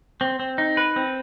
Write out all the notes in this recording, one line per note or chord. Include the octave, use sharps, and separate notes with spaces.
C4
C4
D#4
B4
C4